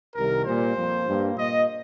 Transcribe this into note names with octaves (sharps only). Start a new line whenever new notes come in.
C2 C3 D#3 G3 A#4
A#2 G3 A#3 C5
F2 F3 A#3
G2 G3 A#3
A#2 A#3 D#5